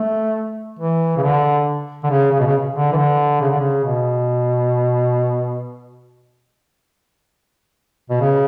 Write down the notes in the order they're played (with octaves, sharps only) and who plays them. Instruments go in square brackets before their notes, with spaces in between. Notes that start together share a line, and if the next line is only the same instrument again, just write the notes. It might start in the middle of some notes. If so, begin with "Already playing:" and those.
Already playing: [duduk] A3
E3
C#3
D3
D3
C#3
C#3
B2
C#3
D3
E3
D3
C#3
D3
C#3
B2
B2
C#3